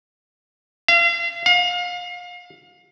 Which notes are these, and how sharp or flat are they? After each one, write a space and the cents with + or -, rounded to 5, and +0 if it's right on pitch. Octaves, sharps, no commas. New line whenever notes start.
F5 -40
F5 +30